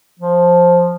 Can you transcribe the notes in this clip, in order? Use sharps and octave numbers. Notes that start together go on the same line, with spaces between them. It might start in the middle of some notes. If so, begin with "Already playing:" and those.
F3